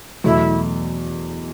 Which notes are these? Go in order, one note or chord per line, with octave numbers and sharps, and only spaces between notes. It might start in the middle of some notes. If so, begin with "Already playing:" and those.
E2 B2 F#3 A3 E4